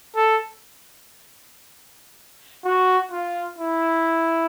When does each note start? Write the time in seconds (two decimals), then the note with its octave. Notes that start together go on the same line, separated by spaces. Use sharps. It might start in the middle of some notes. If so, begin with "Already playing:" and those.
0.16 A4
2.65 F#4
3.12 F4
3.59 E4